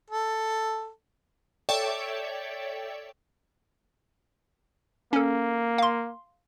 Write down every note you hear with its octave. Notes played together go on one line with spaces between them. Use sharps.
A4
A4 C#5 D5 E5 G5
A#3 C#4 A4
F5 C6